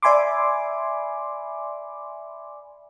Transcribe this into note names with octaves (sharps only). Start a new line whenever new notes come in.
D5 E5 G#5 B5 C6 D6